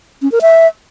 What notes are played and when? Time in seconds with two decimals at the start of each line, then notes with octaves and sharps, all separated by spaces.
0.22 C#4
0.32 A#4
0.41 E5